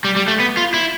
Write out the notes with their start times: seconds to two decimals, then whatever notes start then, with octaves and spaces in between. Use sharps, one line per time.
0.04 G3
0.16 G3
0.28 A3
0.40 B3
0.57 F4
0.74 E4